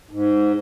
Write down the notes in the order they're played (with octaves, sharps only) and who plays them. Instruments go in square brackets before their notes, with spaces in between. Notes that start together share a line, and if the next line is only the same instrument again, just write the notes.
[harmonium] G#2